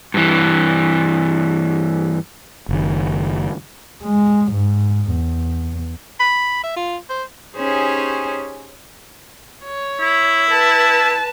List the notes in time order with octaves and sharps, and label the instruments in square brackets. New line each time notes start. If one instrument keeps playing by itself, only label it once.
[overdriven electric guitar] G2 E3
[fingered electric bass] F#1 D#3
[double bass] G#3
G#2
E2
[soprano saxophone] B5
E5
F4
C5
[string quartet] C#4 D#4 G4 G#4 C5 C#5
[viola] C#5
[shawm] E4
[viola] B4 A5